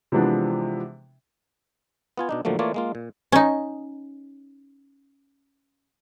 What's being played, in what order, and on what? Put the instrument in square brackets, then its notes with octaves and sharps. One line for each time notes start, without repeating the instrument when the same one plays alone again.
[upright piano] C3 E3 F3 G#3 B3 D4
[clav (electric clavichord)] B3 F4 G#5
B2 D4 D#4
A2 D3 F3 F#3 A3 A#3
E3 A3 A#3 F4 C#5 D5
G#3 A#3 F4
A#2
[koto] C#4 D#4